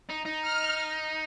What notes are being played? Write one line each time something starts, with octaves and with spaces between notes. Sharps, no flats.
D#4
D#4
F6